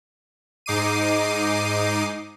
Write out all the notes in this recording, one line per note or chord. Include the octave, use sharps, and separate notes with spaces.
G#2 D#4 D6 C7 D#7